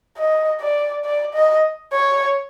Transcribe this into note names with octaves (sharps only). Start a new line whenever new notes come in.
D#5
D5
D5
D#5
C#5